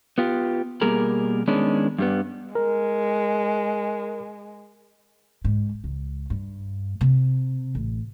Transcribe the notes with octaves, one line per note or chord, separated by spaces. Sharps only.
B3 F4 G4
B2 G3 A#3 G#4 A#4
D#3 G#3 B3 C#4 D4
G2 G3 B3
G#3 A#4
G#2
C#2
G2
C3
A1